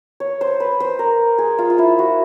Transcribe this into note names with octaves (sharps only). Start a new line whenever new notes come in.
C#5
C5
B4
C5
A#4
G#4
F4
F4
E4
F#4